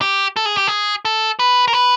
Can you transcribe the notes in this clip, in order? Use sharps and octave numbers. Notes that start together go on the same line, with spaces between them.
G4
A4
G#4
G4
G#4
A4
B4
A#4
B4